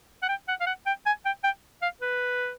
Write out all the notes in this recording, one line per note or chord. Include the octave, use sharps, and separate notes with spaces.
F#5
G5
F#5
F5
F#5
G5
G#5
G5
G5
F5
B4